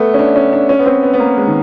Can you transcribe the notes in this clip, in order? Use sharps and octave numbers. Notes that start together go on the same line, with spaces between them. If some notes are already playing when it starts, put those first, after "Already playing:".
Already playing: A3 B3
C#4
D4
C#4
D4
C#4
B3
C4
B3
B3
A#3
G#3
D#3